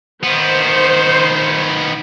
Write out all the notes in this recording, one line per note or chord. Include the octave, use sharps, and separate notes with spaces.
D#3 B3 C5